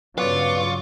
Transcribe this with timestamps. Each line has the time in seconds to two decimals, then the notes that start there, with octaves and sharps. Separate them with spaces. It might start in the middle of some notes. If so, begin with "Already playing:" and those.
0.18 G2 C#3 F#3 B3 F4 D5 C#6 D6